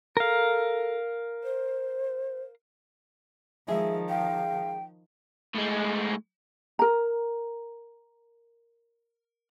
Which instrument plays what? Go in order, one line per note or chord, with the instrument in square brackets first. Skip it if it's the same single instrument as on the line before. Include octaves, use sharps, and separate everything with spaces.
[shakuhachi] A4 [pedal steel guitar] A#4 F5
[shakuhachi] C5
[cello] D#3 F3 [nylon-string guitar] G#3 G#4 [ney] E5
[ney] F5 [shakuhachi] G5
[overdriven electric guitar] A2 G#3
[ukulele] A#4 A#5